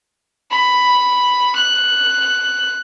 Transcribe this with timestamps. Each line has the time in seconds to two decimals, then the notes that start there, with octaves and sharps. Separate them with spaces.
0.51 B5
1.56 F#6